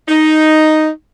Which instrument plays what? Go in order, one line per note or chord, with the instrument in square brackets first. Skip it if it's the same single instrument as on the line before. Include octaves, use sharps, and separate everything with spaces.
[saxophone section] D#4